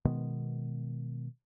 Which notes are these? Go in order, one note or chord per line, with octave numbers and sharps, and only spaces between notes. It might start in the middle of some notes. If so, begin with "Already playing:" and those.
B2 D#3 G#3 B3